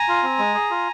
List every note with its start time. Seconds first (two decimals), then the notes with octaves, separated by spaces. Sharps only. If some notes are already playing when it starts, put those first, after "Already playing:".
Already playing: G#5 A#5
0.08 F4
0.23 C4
0.39 G#3
0.54 G#4
0.71 F4